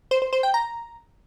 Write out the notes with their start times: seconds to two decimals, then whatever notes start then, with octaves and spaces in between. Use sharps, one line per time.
0.11 C5
0.22 C5
0.33 C5
0.43 G5
0.54 A#5